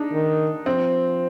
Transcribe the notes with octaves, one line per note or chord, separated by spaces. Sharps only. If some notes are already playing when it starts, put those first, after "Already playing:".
Already playing: D4 D#4
D#3
F3 C4